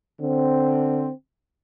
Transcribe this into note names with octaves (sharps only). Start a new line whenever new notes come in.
D3 C4